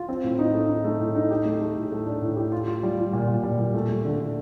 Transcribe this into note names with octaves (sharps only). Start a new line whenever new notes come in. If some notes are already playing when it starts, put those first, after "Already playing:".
Already playing: F4
C4
A2
D#4
A3
D#4
A3
A2
D#4
G4
A3
A3
A2
A3
D4
A2
G4
F4
F4
G3
F4
A#2
A#2
G3
A#2
A3
A3
D3
D3